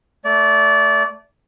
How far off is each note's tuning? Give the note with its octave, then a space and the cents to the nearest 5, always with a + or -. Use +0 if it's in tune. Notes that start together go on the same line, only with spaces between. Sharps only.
A3 +0 D5 -25